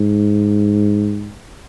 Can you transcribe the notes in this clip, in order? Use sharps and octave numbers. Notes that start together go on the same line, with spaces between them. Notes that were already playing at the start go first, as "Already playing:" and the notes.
Already playing: G#2